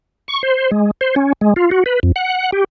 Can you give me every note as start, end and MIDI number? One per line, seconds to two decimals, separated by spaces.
0.28 0.42 85
0.43 0.71 72
0.71 0.91 56
1.01 1.15 72
1.16 1.33 61
1.41 1.54 56
1.56 1.70 65
1.71 1.84 66
1.86 2.00 71
2.03 2.12 41
2.16 2.51 78
2.52 2.64 67